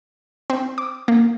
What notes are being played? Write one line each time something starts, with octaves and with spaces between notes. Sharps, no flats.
C4
D6
A#3